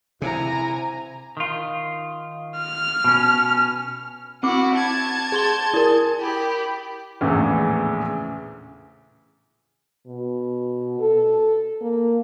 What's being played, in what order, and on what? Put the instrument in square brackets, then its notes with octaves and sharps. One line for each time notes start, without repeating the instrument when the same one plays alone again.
[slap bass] C3 [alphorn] E4 [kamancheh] G#5 A#5
[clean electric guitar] D#3 F4
[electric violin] F6
[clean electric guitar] B2 C#4
[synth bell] C4 D6 [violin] E4 F#4
[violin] A5 G#6
[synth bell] G#4 C6 G7
E4 A#4
[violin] G4 B5
[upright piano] A#1 E2 A2 C#3 E3
[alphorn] B2
A4
A#3